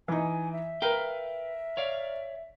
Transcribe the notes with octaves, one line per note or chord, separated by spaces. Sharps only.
E3 D#4 G#5
E5
A#4 B4 F5 G5
C#5 D5 F5